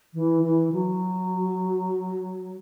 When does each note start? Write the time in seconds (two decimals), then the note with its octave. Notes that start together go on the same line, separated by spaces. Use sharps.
0.14 E3
0.43 E3
0.72 F#3